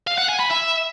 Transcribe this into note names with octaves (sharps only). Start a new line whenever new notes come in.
F5
F#5
G#5
B5
E5